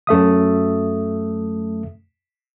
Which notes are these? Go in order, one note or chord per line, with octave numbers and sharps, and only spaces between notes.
F#2 A3 E5 D#6